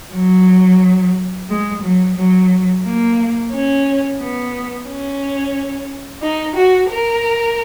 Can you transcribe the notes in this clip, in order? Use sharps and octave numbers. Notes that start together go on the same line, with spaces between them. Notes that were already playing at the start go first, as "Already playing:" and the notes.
F#3
G#3
F#3
F#3
A#3
C#4
B3
C#4
D#4
F#4
A#4